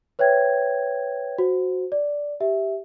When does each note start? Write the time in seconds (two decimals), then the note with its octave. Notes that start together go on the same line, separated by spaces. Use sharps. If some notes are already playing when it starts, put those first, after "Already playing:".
0.19 B4 C#5 E5 G5 G#6
1.38 F#4 C5
1.92 D5
2.40 G4 E5